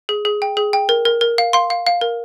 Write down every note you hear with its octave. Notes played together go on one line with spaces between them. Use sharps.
G#4
G#4
G5
G#4
G5
A#4
A#4
A#4
F5
F5 C6
F5
F5
A#4